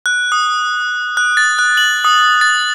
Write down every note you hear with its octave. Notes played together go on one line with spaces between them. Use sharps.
F#6
D#6
F#6
A6
F#6
F#7
D#6
A6